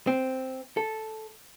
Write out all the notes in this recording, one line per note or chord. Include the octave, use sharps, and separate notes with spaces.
C4
A4